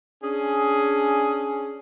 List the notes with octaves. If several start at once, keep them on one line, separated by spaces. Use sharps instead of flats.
C#4 D4 G#4